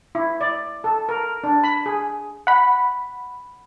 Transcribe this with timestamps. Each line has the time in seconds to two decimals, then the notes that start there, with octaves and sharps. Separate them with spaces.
0.15 E4
0.41 D5
0.84 A4
1.09 A#4
1.44 D4
1.64 B5
1.86 G#4
2.47 F#5 B5